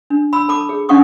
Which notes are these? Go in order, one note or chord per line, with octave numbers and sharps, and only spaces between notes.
D4
B5 E6
A4 A5 B5 D6
G#4
C#4 D4 F5 F#5 C#6 D#6